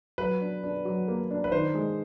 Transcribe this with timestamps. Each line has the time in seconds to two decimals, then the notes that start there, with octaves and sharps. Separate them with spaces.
0.18 F#3 B4
0.41 D4
0.63 D4
0.85 F#3
1.08 A#3
1.31 D4
1.44 B4
1.52 D#3 C5
1.75 G#3